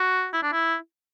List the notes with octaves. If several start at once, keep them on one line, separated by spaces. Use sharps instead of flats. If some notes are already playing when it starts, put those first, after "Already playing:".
Already playing: F#4
E4
D4
E4